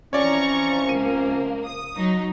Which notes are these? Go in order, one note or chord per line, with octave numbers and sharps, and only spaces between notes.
C3 E3 F3 C#4 C#5 D5 A#5 C#6
C#2 A#3 D#7
D#6
F#3 D#4